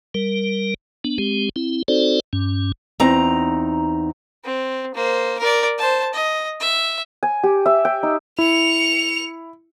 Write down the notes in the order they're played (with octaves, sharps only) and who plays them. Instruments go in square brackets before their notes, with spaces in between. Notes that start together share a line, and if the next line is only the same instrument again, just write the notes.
[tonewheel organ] G3 A#4
B3 D4
G#3 C4 G4
C4 E4
C4 D#4 F#4 A4 C5 D5
G2 C#4
[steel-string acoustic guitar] E2 C4 D#4 A#5
[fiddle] C4
A#3 C5
A#4 D5
C5 A5
D#5
E5
[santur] G#5
G4
E5
G5
D#4
[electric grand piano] E4 [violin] C#7 F7